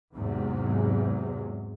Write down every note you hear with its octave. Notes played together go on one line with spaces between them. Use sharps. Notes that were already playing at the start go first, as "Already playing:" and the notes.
E2 G#2 C3 F#3